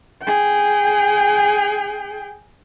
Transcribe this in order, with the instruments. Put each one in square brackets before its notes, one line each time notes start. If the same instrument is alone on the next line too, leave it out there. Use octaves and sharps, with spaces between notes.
[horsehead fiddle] G#4 G5